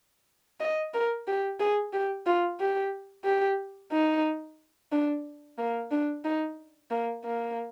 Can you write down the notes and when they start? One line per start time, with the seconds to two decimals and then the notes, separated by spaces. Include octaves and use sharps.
0.60 D#5
0.94 A#4
1.27 G4
1.60 G#4
1.93 G4
2.26 F4
2.60 G4
3.25 G4
3.92 D#4
4.92 D4
5.58 A#3
5.91 D4
6.25 D#4
6.91 A#3
7.24 A#3